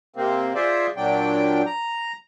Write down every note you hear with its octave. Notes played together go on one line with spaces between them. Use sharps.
C3 A#3 C4
F4 G#4 C5 D5 E5
A#2 F#3 D4 G5
A#5